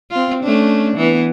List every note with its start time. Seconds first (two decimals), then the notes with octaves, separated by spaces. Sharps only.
0.10 C4 F4
0.43 A3 C#4 D4
0.97 E3 B3